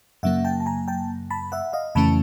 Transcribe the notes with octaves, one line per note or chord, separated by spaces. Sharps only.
F#2 C#3 F#3 A#3 E5 F#5
G5 A5
A5
G#5 A#5
G5 A5
A5 B5
E5 F#5
D#5 F5
F2 C#3 E3 A3 C#4 A5 B5